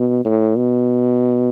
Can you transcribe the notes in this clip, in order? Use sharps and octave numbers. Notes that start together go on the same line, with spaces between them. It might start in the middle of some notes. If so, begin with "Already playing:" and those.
Already playing: B2
A2
B2